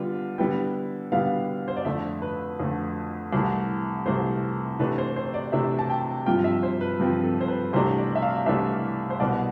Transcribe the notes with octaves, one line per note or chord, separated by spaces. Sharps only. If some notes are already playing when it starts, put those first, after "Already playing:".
Already playing: D3 G3 B3 F4
D3 G3 B3 E4 G5
D3 G3 B3 E4 F5
C5
D5
F2 D3 A3 E5
B4
F2 D3 A3
C2 C3 E3 A3
C2 C3 E3 A3 C5
C3 E3 A3 D4 B4
C5
C5
D5
C3 E3 A3 D4 E5
A5
G5
G2 F3 C4 F4 G5
E5
C5
B4
G2 F3 C4 F4
A4
C5
B4
C2 C3 E3 A3 D4 C5
D5
E5
F5
C2 C3 E3 A3 D4 E5
C5
C2 B2 B3 D5